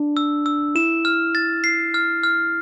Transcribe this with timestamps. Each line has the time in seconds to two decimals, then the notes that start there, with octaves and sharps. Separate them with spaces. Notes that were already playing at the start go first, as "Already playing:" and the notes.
Already playing: D4
0.17 E6
0.46 E6
0.75 E4 E7
1.05 F6
1.35 A6
1.64 C7
1.94 F6
2.24 F6